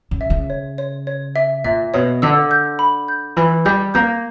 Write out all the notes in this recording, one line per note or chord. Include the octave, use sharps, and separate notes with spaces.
C#3
E5
C#3
C#5
C#5
C#5
E5
A#2 E5
B2 C#5
D3 E6
G6
B5
G6
E3 B5
G3 G6
A#3 G6